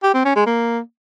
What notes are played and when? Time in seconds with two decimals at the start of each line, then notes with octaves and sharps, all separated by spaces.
0.03 G4
0.14 C4
0.25 C#4
0.36 G#3
0.47 A#3